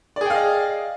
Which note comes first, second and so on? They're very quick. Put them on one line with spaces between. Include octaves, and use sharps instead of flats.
D5 G#4 G5 F5 D#5